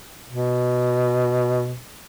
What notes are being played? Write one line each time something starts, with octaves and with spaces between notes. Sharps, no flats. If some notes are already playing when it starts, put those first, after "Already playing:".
B2